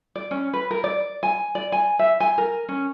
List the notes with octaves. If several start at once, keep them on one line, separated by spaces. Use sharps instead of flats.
D5
C#4
B4
A#4
D5
G#5
D5
G#5
E5
G#5
A#4
C#4